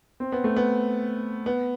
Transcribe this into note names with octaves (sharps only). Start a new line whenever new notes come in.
C4
B3
A3
B3
B3